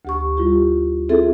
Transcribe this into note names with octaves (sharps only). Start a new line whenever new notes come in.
D2 G4 C#6
G3 E4 F4 G4
C4 E4 F4 G#4 A4 E5